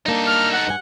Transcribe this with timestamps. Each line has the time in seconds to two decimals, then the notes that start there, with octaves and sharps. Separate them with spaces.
0.06 G3 A#3 D4 D#4 A4
0.27 F6
0.53 F#5
0.67 G2 B4 G#5